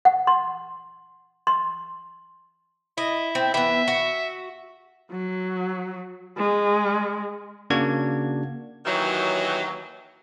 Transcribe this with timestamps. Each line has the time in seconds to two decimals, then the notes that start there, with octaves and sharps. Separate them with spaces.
0.05 F#5
0.27 C6
1.47 C6
2.98 E4 D#5
3.35 C4
3.54 E3 B3 E5
3.88 F#4
5.11 F#3
6.37 G#3
7.70 C#3 A#3 D4 F#4 G#6
8.85 D#2 D#3 E3 F#3